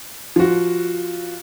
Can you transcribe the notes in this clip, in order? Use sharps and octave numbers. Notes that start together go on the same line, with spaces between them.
F3 F#4